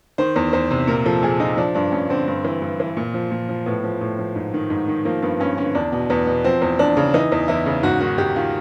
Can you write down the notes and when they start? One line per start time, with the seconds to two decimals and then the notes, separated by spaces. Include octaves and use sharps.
0.18 D#3 C5
0.36 E2
0.53 E2 C5
0.71 C3
0.87 A#2 A#4
1.06 F3 A4
1.23 A#2 G#4
1.40 F3 D#4
1.57 F3 D4
1.74 G2 D4
1.92 G2 C#4
2.10 D3 C4
2.28 G2
2.44 E3
2.62 G2
2.80 E3
2.97 A#2
3.14 F3
3.31 A#2
3.49 F3
3.66 A2 B3
3.84 F3
4.01 A2
4.19 F3
4.36 G#2
4.54 D#3
4.70 G#2
4.88 D#3
5.05 F3 A#3
5.22 G2 B3
5.40 G2 C#4
5.57 D3 C#4
5.75 E2 D4
5.92 B2
6.10 E2 B3
6.27 B2
6.44 F3 C4
6.62 E2
6.79 E2 D4
6.97 C#3
7.14 E3 D#4
7.32 E2
7.48 E2 E4
7.66 C#3
7.83 G#2 F#4
8.00 D#3 F#4
8.18 G#2 G4
8.36 D#3 F4